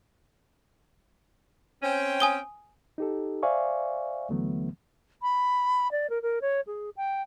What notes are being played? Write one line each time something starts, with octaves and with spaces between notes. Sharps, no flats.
C4 C#4 G5
G#5 D#6 G7
D#4 G4 A4
C5 D5 E5 F5 G#5 C#6
D#2 D3 E3 F#3 A3 B3
B5
D5
A#4
A#4
C#5
G#4
G5